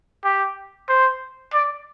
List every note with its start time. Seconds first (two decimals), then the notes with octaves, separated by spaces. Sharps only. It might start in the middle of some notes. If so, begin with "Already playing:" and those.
0.24 G4
0.89 C5
1.53 D5